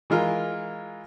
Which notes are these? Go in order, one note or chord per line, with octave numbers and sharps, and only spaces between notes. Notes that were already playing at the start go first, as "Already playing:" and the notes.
E3 G#3 F4 A#4